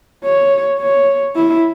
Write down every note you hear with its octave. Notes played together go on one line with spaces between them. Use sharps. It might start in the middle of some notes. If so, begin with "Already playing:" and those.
C#5
C#5
E4